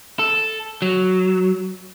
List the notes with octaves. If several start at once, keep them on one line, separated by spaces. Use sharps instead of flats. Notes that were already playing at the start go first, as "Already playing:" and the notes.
A4
F#3